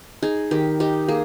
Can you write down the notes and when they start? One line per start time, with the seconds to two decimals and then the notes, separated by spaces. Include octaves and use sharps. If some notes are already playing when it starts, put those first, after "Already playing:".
0.23 D#4 G#4
0.51 D#3 G4
0.80 D#4 G4
1.08 A#3 G#4